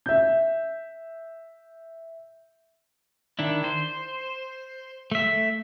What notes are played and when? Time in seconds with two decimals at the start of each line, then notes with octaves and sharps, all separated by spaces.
0.06 E5 G6
3.39 D#3 D4 E4
3.64 C5
5.12 A3 E5